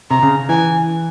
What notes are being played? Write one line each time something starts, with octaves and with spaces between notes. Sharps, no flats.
C3 A#5
C#3
E3 G#5